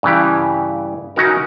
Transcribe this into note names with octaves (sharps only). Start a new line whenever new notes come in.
G2 C#3 E3 G4
C#3 F#3 C#4 D#4 F#4 A#4